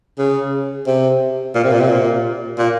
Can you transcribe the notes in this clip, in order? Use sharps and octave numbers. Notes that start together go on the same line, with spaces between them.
C#3
C3
A#2
C3
A#2
C3
A#2
A#2